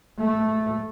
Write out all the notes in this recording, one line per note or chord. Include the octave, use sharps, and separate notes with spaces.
A3